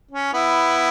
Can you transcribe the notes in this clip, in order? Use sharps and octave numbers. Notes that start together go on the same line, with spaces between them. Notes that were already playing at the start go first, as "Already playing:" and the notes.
C#4
B3 E4